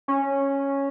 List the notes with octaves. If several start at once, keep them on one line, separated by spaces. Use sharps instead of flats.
C#4